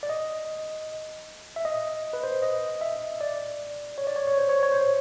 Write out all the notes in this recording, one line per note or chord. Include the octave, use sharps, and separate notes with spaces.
D5
D#5
E5
D#5
B4
C5
D#5
E5
D5
C#5
D5
C#5
C#5
C5
C#5
C#5
C5
C#5